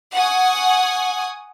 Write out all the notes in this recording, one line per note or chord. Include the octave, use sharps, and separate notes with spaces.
F#5 G#5 C#6 D#6